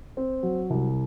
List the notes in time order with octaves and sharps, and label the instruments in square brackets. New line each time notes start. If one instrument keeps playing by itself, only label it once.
[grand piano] C4
F#3
C2